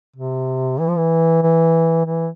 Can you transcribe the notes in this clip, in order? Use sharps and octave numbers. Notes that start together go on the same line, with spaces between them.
C3
E3
F3
E3
E3
E3